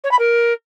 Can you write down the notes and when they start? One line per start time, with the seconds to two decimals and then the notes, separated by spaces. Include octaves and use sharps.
0.03 C#5
0.11 B5
0.18 A#4